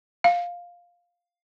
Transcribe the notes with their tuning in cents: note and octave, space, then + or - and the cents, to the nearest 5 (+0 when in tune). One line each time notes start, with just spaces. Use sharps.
F5 +5